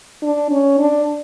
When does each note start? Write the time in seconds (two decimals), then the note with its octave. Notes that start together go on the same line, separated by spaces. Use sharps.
0.23 D4
0.51 C#4
0.79 D4